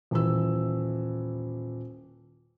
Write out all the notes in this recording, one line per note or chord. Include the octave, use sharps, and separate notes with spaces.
D#1 E3 E6